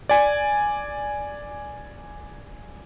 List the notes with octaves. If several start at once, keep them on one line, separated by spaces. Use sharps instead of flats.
D5 G#5